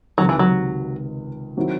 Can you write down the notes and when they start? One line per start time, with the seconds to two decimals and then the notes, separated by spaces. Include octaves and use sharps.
0.18 C#2 C3 D#3 F#3
0.29 E3
0.39 F#3
1.57 D#3 F#3 C4 E4